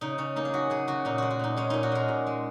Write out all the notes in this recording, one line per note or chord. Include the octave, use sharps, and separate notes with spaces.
C#3 D#4
C#3 C#4
A#3 D#4
G#4
F#3 F#4
C#3 G#4
C#3 F#4
A#2 D#4
G#3 F#4
F#4
A#2 D#4
G#3 C#4
A#2 D#4
F#4
G#3 A#4
A#2
G#3